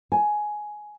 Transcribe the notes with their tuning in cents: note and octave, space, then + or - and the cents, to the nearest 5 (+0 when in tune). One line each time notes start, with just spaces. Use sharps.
G#5 +10